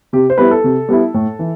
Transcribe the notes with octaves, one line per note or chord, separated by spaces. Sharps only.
C3 G4
C5
G3 B3 E4 B4
A4
C3
G3 B3 E4
A2
E3